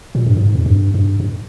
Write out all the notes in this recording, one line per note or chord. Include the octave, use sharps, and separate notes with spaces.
A#2
G2
G#2
F2
G2
G2
G2